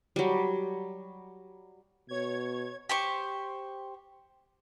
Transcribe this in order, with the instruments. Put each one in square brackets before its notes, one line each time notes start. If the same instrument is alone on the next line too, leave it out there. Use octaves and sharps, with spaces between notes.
[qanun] F#3 G3
[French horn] B2 [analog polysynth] C#5 G#6
[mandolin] G4 C5 C#6